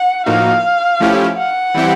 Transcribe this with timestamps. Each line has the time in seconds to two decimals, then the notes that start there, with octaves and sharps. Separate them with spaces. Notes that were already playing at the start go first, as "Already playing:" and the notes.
Already playing: F#5
0.26 A2 F3 A#3 D#4 F#4 F5
1.00 F3 A3 C#4 E4 G4
1.38 F#5
1.74 E3 G3 C4 E4 G4